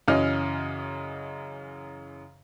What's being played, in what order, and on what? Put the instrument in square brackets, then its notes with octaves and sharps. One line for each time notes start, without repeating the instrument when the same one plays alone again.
[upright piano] F#2 C#3 E3 C#4 D#5 F6